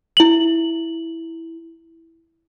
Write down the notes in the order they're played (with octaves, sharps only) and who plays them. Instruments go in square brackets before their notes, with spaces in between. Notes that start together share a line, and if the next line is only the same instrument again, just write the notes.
[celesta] E4 F#7